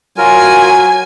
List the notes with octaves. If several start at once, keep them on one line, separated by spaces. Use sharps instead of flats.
F#3 F4 A#4 G#5